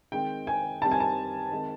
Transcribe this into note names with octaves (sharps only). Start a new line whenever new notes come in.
D#3 G#3 C4 G5
G#5
D#3 G3 C4 A5
G#5
A5
D#3 G#3 C4